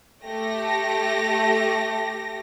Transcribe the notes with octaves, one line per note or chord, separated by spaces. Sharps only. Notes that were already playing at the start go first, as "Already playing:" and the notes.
A3 G4 A#6